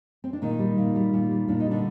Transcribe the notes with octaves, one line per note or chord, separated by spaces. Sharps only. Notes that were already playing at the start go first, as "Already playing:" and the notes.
C4
D4
A#2 D#3 D#4
G3
A#2
G3
A#2
G3
A#2 D4
D#4
G3
D3 D4